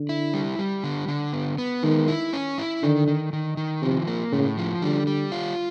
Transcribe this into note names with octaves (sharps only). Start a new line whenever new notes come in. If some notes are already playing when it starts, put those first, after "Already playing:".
Already playing: D3
E4
G3
G3
D3
D3
B3
B3
D#3 G#3
E4
C#4
E4
D3 D#3
D#3
D#3
D#3
C3 F3
A#3
A2 C#3
F3
D3 G3
G3
F4